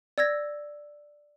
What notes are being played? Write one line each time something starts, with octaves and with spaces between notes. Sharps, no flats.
D5 E6 G#6 A#6